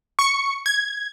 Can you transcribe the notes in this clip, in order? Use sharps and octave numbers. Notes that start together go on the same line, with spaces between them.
C#6 C#7
G#6